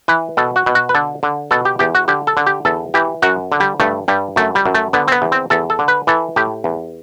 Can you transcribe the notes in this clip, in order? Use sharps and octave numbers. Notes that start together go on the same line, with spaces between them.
E3 B4
B2 A4
F#4
B2
F#4
B4
D3 A4
D3
B2 A4
G4
E2 G4
F#4
D3 G4
A4
D3
G4
E2 A4
E3 G4
F#2 F#4
D3
G3
G2 A3
G2 G3
F#2 A3
G3
F#2
A3
D3 B3
C4
B3
E2
C4
E2 A4
A4
D3
B4
E3 A4
A2 G4
E2